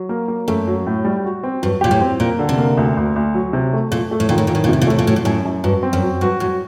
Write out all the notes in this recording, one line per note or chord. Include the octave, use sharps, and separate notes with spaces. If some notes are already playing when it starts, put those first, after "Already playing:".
Already playing: F#3
A#3
A#3
F#2 A3
F#3
A2
G3
F#4
C4
G2 F#3
A#2 G4
A2
C4
A#2 A#3
D3
C3
A#3
D2
D2
D2
F#3
C3
A3
A#2 A3
A3
A2
A#2 D#3
A2
A#2 D#3
A2
A#2
A2 C3
A#2
A2 A3
A#2
A2 F#3
A#2
F#2 A2
F#2
G2 F#3
C4
F#2
F#3
G2 F#4
A2 F#4